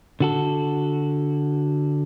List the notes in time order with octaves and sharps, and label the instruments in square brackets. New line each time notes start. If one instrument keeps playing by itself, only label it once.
[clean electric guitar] D3 F#4 A4